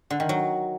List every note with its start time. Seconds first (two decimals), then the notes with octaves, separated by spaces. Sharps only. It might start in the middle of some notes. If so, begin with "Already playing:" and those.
0.10 D3
0.20 D#3
0.29 F#3